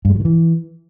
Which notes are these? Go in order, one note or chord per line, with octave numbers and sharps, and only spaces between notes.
G2
G#3
F#3
D#3
E3